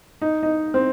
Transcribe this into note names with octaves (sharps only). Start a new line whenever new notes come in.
D#4
D#4
C4